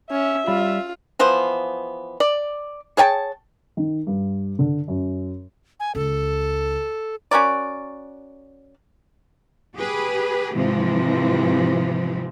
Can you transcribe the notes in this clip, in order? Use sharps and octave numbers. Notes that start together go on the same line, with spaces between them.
C#4 E5
G3 F4 B5
E3 F3 B3 C5
D5
G#4 C#5 G5 A5
D#3
G2
D3
F#2
G#5
C#2 A4
C#4 F#4 A#4 D5
G4 G#4 B4
G#2 C3 E3 F3 G#3 C4